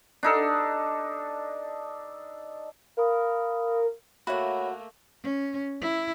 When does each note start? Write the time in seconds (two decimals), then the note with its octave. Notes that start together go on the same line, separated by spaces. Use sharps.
0.23 D4 D#4 A4
2.97 A#4 F5 B5 D#6
4.27 A3 A#3 F#4 C#5 E5 F#5 B5
5.23 C#4
5.81 E4